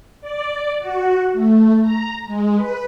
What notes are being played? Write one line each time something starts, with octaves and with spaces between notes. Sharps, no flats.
D5
F#4
A3
A#5
G#3
B4